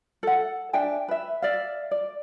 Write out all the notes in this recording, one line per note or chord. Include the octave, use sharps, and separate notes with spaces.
A4 F#5
D4 E5 G5 G#5
B4 E5
D5 E5 F5
D5